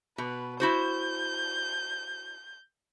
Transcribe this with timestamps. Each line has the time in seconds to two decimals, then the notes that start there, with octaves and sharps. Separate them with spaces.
0.18 B2 B4
0.60 E4 F#4 C5 G6